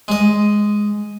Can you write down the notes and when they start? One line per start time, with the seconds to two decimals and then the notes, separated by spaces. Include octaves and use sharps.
0.08 G#3 D#5